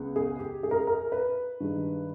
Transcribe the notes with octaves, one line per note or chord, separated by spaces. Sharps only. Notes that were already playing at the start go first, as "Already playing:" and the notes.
Already playing: C#2 C#3 G#3 B3
G#4
G4
G#4
A#4
G#4
A#4
B4
G2 D#3 G#3